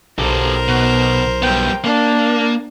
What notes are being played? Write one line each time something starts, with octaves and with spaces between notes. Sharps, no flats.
B1 G4 A4 A#4 C5
B2
G3 B3 G5
A#3 D4